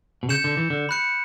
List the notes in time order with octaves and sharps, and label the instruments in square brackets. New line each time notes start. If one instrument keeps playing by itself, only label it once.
[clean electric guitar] B2
[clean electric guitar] C#3 [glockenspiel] G6 C#7 E7
[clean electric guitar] D3
E3
D3
[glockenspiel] B5 F#6 C#7